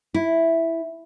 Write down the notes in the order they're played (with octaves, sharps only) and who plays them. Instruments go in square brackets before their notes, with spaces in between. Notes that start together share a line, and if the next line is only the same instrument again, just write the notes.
[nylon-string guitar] E4